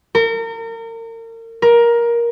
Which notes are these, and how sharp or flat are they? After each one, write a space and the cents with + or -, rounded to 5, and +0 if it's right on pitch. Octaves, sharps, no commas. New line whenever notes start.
A#4 -35
A#4 +15